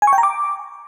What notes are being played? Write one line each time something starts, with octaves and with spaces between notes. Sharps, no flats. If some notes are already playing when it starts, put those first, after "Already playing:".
G#5
C#6
G5
A#5
D6